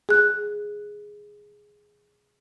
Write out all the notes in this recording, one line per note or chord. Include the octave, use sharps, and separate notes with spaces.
G#4 F#6